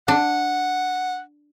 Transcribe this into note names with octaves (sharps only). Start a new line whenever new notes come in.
D4 F#5